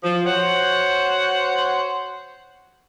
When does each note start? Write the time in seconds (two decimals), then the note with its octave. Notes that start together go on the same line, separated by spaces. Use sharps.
0.03 F3
0.26 F#4 C5 C#5 F#5